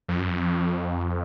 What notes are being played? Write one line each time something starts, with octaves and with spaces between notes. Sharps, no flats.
F2
F#2
F2